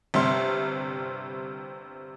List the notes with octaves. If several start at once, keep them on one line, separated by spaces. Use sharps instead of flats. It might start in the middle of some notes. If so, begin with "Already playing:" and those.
G1 C3 G3 C6